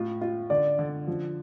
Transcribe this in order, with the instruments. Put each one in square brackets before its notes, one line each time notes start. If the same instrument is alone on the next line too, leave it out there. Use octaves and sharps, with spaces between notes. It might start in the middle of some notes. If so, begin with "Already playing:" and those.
Already playing: [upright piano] A2 F4
F4
[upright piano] D3 [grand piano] D5
[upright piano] D3
F3